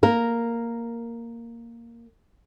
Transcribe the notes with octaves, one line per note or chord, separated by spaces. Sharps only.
A#3 A#4